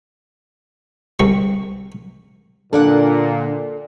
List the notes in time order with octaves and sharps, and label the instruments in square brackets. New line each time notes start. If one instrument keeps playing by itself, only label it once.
[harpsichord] C2 C4 C#6
[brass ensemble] A#2 [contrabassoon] D3 [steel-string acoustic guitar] A#3 D4 F#5 [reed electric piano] A4 D5